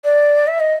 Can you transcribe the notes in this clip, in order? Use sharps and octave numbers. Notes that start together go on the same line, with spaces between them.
D5
E5
D#5